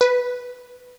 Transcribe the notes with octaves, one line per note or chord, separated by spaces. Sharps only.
B4